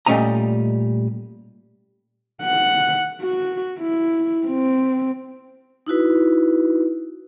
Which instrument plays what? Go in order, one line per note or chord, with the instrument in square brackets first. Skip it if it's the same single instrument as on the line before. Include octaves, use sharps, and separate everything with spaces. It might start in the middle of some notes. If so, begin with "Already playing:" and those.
[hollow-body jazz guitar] A#2 G3 A3 C#4 D#5 A#5
[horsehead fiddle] F#5
F#4
E4
C4
[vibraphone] D#4 E4 F#4 B4